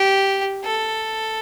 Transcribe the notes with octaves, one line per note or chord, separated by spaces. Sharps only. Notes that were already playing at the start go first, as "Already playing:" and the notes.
Already playing: G4
A4